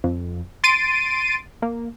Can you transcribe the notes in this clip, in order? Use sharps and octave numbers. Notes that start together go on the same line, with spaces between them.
F2
C6 A6 C7 D7 D#7
A#3